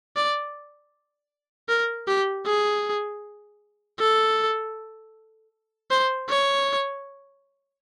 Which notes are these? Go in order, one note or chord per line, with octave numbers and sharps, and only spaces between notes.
D5
A#4
G4
G#4
A4
C5
C#5